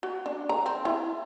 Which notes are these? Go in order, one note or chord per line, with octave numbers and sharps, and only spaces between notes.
F#4
D4
A#5
C4
E4